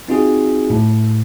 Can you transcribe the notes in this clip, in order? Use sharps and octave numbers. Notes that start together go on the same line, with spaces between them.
C4 D#4 F4 F#4 G#4
A2